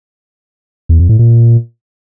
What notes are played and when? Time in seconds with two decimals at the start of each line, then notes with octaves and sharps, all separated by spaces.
0.89 E2
0.99 F2
1.09 A2
1.19 A#2